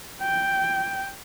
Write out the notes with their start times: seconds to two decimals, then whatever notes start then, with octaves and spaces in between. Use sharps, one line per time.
0.21 G5